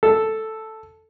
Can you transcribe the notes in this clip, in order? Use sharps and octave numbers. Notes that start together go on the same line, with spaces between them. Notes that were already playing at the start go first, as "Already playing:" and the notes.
A4